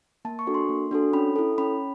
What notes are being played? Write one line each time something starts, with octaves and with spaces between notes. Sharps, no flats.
A#3 A5
C#6
D4 F#4 A4
C6
A#3
D4 F#4 A4
C#4 B5
E4 A4
C#4 B5